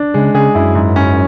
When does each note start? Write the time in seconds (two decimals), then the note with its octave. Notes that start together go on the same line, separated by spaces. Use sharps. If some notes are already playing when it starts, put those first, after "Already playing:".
Already playing: D4
0.14 C#3 G#3
0.35 C#3 G#4
0.55 F#2 E4
0.75 G#2
0.96 C#4